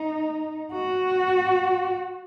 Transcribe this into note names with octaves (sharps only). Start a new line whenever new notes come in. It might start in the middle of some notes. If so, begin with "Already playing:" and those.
Already playing: D#4
F#4